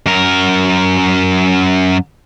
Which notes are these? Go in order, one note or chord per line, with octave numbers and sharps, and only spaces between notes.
F#2 A#4